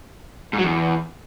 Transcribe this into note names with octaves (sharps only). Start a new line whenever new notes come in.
G#2
F#3
E2